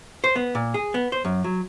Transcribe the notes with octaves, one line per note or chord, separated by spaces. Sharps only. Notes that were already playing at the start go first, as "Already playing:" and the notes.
C5
B3
A#2
G#4
B3
C5
F#2
F#3